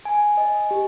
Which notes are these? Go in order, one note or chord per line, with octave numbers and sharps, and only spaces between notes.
G#5
D#5
G4